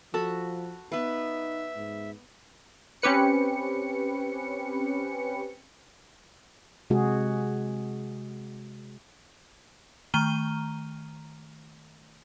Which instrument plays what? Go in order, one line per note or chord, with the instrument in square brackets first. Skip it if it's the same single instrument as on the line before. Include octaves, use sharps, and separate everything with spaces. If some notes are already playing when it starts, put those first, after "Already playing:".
[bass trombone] F3 [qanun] F#4 B5 [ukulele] A4
[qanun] B3 B4 [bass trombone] D#4 [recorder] E5
[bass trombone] G#2
[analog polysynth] C4 C#4 G4 B4 C#7
[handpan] C3 G#3 F#4 G#4
[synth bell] D#3 A3 A#5 F6 D#7 G7